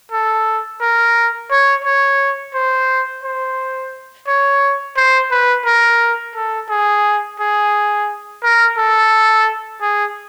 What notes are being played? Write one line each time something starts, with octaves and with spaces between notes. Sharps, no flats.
A4
A#4
C#5
C#5
C5
C5
C#5
C5
B4
A#4
A4
G#4
G#4
A#4
A4
G#4